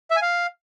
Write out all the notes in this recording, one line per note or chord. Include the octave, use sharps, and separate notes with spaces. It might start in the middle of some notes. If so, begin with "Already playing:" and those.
E5
G#5
F5